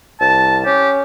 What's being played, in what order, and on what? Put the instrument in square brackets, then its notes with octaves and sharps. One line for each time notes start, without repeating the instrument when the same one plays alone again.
[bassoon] C2 [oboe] A5
[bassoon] C#4 [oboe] G4